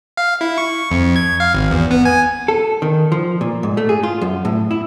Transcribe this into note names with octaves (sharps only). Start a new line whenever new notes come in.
F5
E4
C#6
F2
G#6
F5
G#1
E2
B3
G#5
A4
D#3
F3
A#2
G#2
A3
G#4
F4
F#2
A2
E4